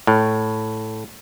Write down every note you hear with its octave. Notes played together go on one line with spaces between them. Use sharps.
A2